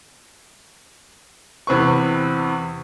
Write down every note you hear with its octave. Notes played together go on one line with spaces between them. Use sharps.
E2 C3 B4 C#6